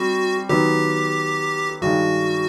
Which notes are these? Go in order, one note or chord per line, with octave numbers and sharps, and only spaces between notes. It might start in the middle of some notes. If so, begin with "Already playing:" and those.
Already playing: G3 C4 F#4
D#3 F#3 B3 G4
G2 D#3 G#3 F#4